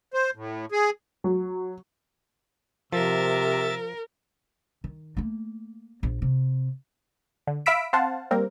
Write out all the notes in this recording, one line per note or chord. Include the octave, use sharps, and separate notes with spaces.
C5
A2
G#4
F#3
C3 F3 A#4 E5 A6
D#3
A3 A#3
A#1
C3
D3
E5 F5 B5 E6 B6 D7
C4 C5 F5 F#5 A5
G3 A#3 C4 A#4